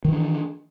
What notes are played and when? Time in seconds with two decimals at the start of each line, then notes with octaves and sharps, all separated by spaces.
0.05 D#3
0.09 E3
0.12 D4